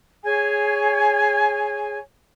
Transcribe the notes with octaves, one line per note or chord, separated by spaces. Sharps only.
G#4 C#5 G#5